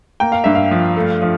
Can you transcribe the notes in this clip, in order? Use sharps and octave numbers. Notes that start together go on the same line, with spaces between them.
A#3 G5
F5
G2 E5
F5
F3
A3
F3